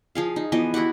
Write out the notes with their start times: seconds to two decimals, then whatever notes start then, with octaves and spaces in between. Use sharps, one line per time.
0.15 F3 G#4 F5
0.36 D#4
0.52 E3 F3 B3 D#5
0.74 E4 F#4 G4 F#5